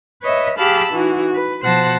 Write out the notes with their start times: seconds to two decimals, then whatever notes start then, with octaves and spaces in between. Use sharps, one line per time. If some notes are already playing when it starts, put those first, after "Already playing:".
0.21 B4 C#5 D#5 E5
0.58 G4 G#4 F5 A5 B5 E6
0.92 E3 D#4 F#4
1.33 B4
1.62 B2 F3 C5 F#5 A5 A#6